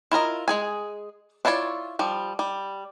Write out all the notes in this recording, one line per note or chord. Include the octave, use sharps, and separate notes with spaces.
E4 F4 A#4 D#5
G#3 G#4 G#5
D4 E4 F4 C#5 D5
F3 G3
G3